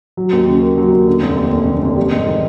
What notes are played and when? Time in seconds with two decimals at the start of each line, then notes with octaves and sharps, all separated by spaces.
0.17 F#3
0.33 D#2
0.48 C#3
0.63 A#3
0.77 F#3
0.93 D#2
1.08 D3
1.22 F1
1.37 D#2
1.52 F1
1.66 D3
1.82 F1
1.96 G3
2.12 G#2
2.27 D#3